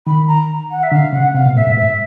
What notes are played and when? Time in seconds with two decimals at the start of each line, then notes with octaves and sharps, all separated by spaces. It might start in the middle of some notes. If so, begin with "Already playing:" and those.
0.07 D#3 B5
0.27 A#5
0.70 F#5
0.83 E5
0.92 D3 F5
1.13 C#3 F#5
1.34 C3 F5
1.46 B2
1.55 A2 E5
1.67 G2
1.77 G#2 E5